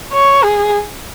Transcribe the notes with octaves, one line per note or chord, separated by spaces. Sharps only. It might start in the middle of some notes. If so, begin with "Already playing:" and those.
C#5
G#4